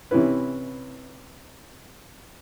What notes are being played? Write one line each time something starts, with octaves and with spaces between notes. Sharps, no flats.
C3 E3 C#4 E4 B4